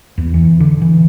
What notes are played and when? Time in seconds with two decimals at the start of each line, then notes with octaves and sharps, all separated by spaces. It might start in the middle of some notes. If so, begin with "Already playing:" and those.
0.18 E2
0.34 E3
0.60 D3
0.82 E3